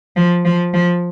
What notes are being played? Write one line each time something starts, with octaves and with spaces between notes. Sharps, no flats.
F3
F3
F3